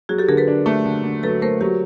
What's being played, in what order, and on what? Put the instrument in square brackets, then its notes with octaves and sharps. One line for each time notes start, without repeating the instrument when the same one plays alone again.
[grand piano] F#3 [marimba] F#4 G#4
[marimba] G4 A4
[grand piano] D3 [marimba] G#4 A#4
[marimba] A4 B4
[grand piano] D4
A3
D3
D3
[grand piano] F#3 [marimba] A4 B4
[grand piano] A3 [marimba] A#4 C5
[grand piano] F#3 [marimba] G4